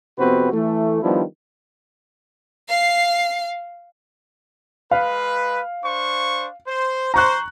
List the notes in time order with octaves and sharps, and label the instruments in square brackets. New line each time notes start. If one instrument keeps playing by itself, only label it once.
[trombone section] F2 C3 B3 C4 F#4 B4
E3 A3
D#3 F3 G3 B3 D4 E4
[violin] F5 C7
[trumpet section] G#3 B4 [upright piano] F5
[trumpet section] D4 C5 C#6
C5
[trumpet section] C5 [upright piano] A#5 C#6 F#6